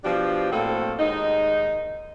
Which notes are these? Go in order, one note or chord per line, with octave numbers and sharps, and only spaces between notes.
B2 F3 D4 G4
A2 A#3 C4 F#4 A4
D#2 G#2 D#4